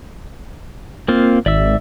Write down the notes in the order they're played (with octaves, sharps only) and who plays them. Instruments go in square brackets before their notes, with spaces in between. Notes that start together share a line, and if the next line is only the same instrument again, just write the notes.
[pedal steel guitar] A#3 C4 F4
[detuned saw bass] G#1 [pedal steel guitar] D5 E5 E6